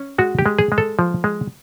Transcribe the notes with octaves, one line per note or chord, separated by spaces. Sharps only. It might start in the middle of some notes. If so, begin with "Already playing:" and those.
Already playing: C#4
G#3 F#4
G4
G#3
G#4
G#3
A4
F3
G#3